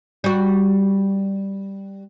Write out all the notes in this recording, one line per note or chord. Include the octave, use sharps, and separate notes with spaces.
G3 F#4